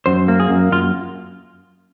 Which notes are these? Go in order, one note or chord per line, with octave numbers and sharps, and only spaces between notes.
F#2 C5
A#3
G#4
F#2
F#2 F4